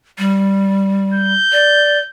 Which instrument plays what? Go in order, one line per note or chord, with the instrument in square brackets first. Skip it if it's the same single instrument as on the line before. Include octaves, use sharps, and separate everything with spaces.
[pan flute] G3
[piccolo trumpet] G6
[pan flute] D5